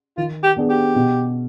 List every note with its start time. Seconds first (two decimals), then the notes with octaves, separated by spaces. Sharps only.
0.17 D#3 F4
0.43 G4
0.57 B3 D4 G#4
0.70 G4
0.96 B2